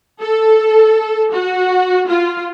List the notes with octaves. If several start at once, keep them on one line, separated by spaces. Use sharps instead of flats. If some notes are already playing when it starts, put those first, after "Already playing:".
A4
F#4
F4